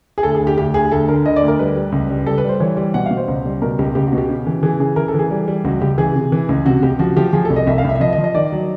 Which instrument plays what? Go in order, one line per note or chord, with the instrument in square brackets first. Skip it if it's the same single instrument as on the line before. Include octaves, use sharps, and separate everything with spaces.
[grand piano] G#4
D2 A4
G#4
D2
G4
D2 G4
D2 G#4
D2 A4
D3 A#4
D3 D#5
D5
D2
A#4
G3 B4
G3
C#2
G3
G3 A4
B4
G3 C5
E3 C#5
G3
B2 F#5
F5
B2
C5
C#2
G3
B2 A#4
C#2 G4
C#2 G4
F#4
B2
G4
C#3
E3
E3 G#4
C#3 G#4
E3 A#4
A4
E3 G#4
G3
G3
C#2 F#4
C#2 G4
E3 G#4
C3
E3
C#2
C3 F#4
C#2 G4
F3 F#4
F3 G4
F3 G#4
A4
C2
D#5
C2 E5
F5
C2 E5
E5
F3 D#5
D#5
F3
D#5
D#3 D5
F#3